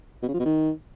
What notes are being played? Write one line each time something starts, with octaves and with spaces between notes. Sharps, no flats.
B2
C#3
F3
B2
D#3